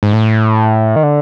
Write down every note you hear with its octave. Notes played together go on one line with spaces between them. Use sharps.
G#2
A2
D#3
D3